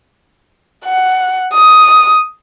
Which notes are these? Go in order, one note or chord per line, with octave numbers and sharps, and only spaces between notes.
F#5
D#6